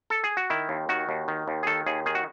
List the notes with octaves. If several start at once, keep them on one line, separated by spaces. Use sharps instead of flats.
A4
G#4
F#4
D#3 E4
D#2
D#3 F#4
D#2
D#3
D#2
G#4
D#3 A4
D#2 G#4
D#3 G#4
F#4